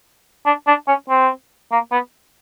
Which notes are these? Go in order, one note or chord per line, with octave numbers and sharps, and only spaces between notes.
D4
D4
C#4
C4
A#3
B3